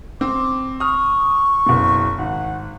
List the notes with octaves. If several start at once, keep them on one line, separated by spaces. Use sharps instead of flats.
C4 D6
C#6 D#6 F6
F#1 B2
G#1 F#5